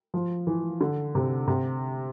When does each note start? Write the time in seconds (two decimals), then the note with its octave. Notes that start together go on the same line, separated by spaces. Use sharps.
0.14 F3
0.47 E3
0.81 D3
1.15 C3
1.48 C3